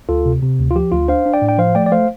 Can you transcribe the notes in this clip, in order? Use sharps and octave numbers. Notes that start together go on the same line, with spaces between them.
D2 F4 A4
C3
C3
D2
F4
F3 G4
D2 F4
D4 C5 F5
D4
D5 G5
A2
G5
F3 C5 F5
A3 D5 G5
D5
A3 C5 F5